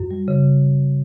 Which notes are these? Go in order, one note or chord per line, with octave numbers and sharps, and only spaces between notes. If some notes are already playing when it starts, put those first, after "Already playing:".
Already playing: F#2
G3
C#3